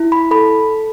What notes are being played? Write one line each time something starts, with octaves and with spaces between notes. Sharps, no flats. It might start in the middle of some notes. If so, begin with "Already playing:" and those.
Already playing: E4
B5
A4 B5